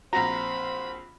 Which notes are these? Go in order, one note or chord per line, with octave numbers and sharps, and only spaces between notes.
A#1 C4 F#4 C5 A#5 B5